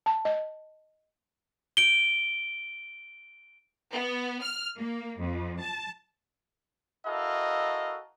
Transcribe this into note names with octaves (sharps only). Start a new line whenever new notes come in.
A5
D#5
D7 G7
B3
F6
A#3
F2
A5
E4 F#4 A4 A#4 D#5 F5